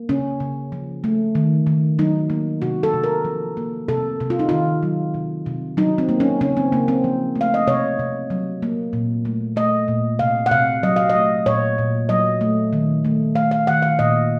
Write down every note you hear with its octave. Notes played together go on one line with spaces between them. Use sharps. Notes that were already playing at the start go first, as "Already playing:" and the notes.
Already playing: A#3
C#3 C#4
C#3
F3
A3
D#3
D#3
F#3 D#4
A#3
C3 F#4
A4
C3
A#4
F3
A#3
C3 A4
C3
F4
D#4
D#3 F4
F#3
C3
C3
F#3 D#4
C4
A#3
C#4
C#3 C#4
C4
C#3 A#3
C4
F3
A3
F5
D#5
C3 C#5
C3
F#3
A#3
A#2
A3
A3 D#5
A#2
C3 F5
F#5
C3 F5
F#3 D#5
F5
D#5
A3
A#2 C#5
A#2
F#3 D#5
A3
D#3
A3
A3 F5
F5
D#3 F#5
F5
A#2 D#5